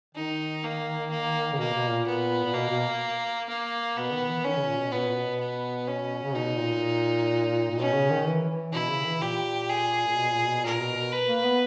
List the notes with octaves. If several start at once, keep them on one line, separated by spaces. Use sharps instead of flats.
D#3 D#4
A#3
A#3
C#3
B2 A#3
B2
A#2
B3
A#2
B2 A#3
B2
A#3
B2 B3
D#3
E3
D#3 C#4
C#3
A#2
B2
A#2 B3
B2
A#2
B2
B3
C#4
C#3
B2 D#4
A#2
A#2
B2 C#4
C#3
D#3
E3
E3
B2 E4
C#3
E3
A#2 G4
G#4
A#2
B2
A#2
B2
A#2 A#4
B2
B2
B4
A#3
B3